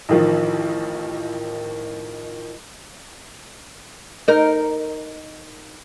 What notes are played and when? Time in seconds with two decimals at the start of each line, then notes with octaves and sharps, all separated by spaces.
0.09 A1 D#3 F3
4.28 D#4 A#4